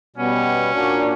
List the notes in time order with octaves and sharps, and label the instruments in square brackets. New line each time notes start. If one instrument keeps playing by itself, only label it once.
[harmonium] B2 G3 B3 [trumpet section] C#4
[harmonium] A#2 A#3 D4 F#4